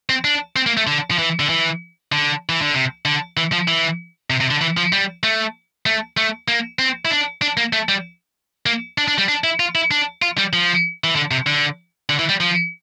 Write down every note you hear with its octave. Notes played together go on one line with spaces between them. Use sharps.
C4
D4
C4
A#3
A3
D3
F3
E3
D3
E3
D3
E3
D3
C3
D3
E3
F3
E3
C3
C3
D3
E3
F3
G3
A3
A3
A3
A#3
C4
E4
D4
D4
A#3
A3
G3
A#3
D4
D4
G3
D4
E4
F4
E4
D4
F4
G3
F3
E3
D3
C3
D3
D3
E3
G3
F3